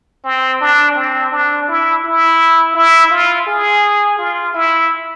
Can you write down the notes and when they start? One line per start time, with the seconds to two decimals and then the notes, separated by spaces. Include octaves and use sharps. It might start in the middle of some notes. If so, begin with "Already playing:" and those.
0.24 C4
0.61 D4
0.96 C4
1.32 D4
1.68 E4
2.04 E4
2.75 E4
3.11 F4
3.47 G#4
4.18 F4
4.54 E4